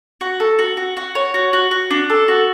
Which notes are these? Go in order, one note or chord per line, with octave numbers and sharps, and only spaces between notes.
F#4
A4
F#4
F#4
F#4
C#5
F#4
F#4
F#4
D4
A4
F#4